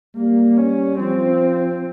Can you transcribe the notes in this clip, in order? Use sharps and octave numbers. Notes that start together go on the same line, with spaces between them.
G3 A#3
C#4
F3 C4